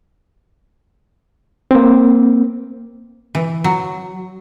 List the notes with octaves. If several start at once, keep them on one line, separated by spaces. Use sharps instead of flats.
A#3 C4
E3
F#3